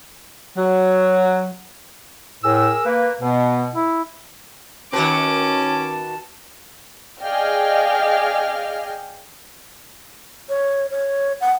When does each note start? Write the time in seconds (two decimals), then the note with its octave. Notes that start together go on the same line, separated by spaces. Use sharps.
0.57 F#3
2.44 A2 G#4 A#4 E6
2.85 A#3 B4
3.21 B2 B3
3.75 E4
4.93 D#3 C#4 F#4 B4 A5 D6
7.22 G#4 D5 D#5 F5 G5 F6
10.49 C#5
10.91 C#5
11.41 F#5